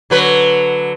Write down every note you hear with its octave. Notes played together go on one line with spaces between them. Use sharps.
D3 F#3 B4